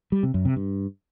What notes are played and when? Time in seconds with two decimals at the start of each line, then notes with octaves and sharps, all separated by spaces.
0.12 G3
0.23 C3
0.34 F#2
0.45 C3
0.56 G2